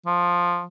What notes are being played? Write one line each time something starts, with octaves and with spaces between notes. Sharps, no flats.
F3